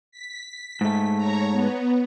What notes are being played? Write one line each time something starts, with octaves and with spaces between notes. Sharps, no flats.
B6
G#2 A3
C#5 A#5
B3